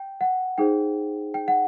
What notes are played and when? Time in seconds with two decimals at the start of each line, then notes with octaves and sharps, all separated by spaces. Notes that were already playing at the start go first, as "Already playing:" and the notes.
Already playing: G5
0.21 F#5
0.58 D#4 G#4 C5 G5
1.34 G5
1.48 F#5